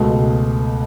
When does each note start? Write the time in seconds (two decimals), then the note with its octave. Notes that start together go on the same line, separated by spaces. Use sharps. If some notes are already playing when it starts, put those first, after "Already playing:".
Already playing: C#2 B2 A3